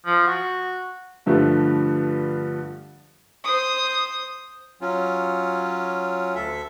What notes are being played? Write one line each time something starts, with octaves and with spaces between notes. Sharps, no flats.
F3
F#4
G2 D3 F3 A3
C5 D#6
F#3 C#4 F4
D2 A4 E5